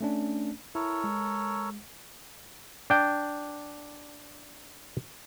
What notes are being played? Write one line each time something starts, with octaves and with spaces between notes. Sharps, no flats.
A3 C#4 D4
E4 A4 A#4 C#5
G#3
D4 G5